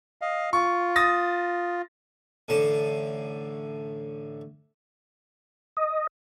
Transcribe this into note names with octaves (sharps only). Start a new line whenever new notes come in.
D#5 F5
F4 C#6
D#6 A6 A#6
A1 A2 D3 A5
D#5